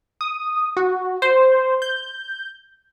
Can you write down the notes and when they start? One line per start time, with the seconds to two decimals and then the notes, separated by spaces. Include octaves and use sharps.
0.21 D#6
0.77 F#4
1.22 C5
1.82 G6